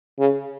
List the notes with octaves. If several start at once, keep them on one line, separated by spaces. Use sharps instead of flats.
C#3